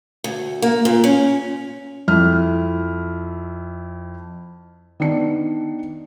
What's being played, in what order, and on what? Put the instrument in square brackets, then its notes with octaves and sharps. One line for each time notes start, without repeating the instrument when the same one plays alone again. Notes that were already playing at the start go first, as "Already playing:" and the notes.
[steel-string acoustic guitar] D2
A#3
A#2
C#4
[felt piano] F2 E4 F6
D#3 B3 D4 C#7